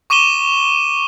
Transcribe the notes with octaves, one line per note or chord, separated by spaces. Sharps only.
C#6 D6 D#7 E7 G7